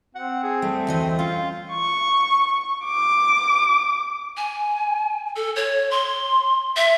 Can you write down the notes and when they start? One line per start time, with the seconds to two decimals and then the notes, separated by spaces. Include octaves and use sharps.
0.15 C4 F#5
0.43 G#4
0.62 G3 A3
0.87 D2 E3 D#5
1.19 C#4 F4
1.72 C#6
2.84 D6
4.37 G#5
5.36 A4
5.56 C#5
5.91 C6
6.76 E5